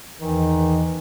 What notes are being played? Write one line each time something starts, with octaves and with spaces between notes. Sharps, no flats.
E2 D#3 E3